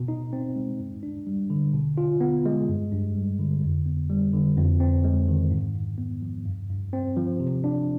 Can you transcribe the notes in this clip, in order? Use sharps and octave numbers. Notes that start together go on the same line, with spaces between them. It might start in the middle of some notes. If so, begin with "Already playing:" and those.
Already playing: B2
D#4
C4
G#3
G2
D4
G3
D3
B2
F4
B3
G#3
G2
G2
G3
D3
F2
B3
G3
D3
F2
C4
G#3
D#3
G#2
G#2
B3
F3
G2
G2
C4
F3
C3
D4